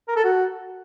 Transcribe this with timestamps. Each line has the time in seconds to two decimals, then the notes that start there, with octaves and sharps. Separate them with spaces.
0.08 A#4
0.16 A4
0.24 F#4